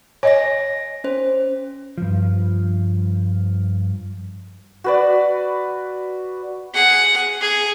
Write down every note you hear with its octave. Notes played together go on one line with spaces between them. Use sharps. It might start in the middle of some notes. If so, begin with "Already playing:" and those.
C#5 D#5 G#5 A#6
C#4 C5
G2 F3
F#4 B4 D5
G#4 F#5
G#4